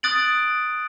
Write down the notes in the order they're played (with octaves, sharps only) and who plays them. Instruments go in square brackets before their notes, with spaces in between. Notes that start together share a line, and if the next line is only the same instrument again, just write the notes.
[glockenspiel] D#6 F#6 A6 D7 F#7